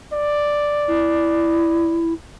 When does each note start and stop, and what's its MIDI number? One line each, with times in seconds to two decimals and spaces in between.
0.13 2.03 74
0.88 2.13 64